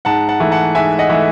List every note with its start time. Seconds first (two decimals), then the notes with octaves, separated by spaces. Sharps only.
0.05 G#2 F#5 A5
0.29 F#5 A5
0.40 E3 A3
0.52 F#5 A5
0.75 G#2 E5 G#5
0.99 D#5 F#5
1.10 E3 A3